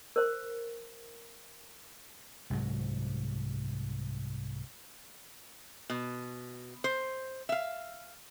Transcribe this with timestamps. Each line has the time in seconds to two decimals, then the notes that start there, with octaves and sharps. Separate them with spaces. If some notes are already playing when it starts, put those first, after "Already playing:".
0.16 A#4 C5
2.50 C2 G#2 F#3
5.90 B2
6.84 C5
7.49 E5 F5